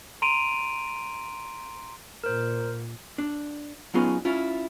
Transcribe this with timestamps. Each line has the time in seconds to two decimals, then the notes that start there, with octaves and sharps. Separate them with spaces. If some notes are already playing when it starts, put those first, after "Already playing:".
0.22 A#5 C6 D7 D#7 F7
2.24 A#2 A#4 C5
3.18 D4
3.94 F#3 B3 C#4 D#4 F4 G#4
4.25 C#4 E4 F4